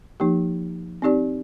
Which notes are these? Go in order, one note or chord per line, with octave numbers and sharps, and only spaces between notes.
F3 A#3 D#4 G4
C4 D#4 G4 D5